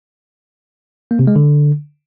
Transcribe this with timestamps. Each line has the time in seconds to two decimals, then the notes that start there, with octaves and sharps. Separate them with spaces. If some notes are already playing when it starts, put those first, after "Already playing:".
1.11 A#3
1.19 C3
1.27 G#3
1.36 D3